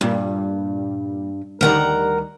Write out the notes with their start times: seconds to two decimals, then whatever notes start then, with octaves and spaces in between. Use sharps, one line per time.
0.01 G2 A#2 G3
1.61 D2 D#3 G3 A#4 F#5 A#5